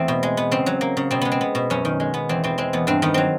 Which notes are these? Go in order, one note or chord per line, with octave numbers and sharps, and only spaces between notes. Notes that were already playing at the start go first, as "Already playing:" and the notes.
Already playing: E2 A3 C4
B2
G#3
B3
C#3 C4
F#3
A#3
C#3
B2 C4
G#3 B3
C4
B3
B2
F#2 C#4
D#3
G#3
B3
E2 C4
B2 C4
G#3 C4
E2 B3
G2 C4
D#3 B3
F#3 C4